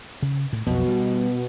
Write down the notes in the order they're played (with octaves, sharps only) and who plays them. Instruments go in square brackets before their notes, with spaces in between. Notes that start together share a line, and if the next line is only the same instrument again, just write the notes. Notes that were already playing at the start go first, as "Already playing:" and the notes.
[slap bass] C#3
A2
[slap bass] B1 F2 [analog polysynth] B2
[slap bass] G3